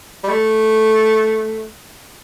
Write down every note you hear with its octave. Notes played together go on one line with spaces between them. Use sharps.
G3
A3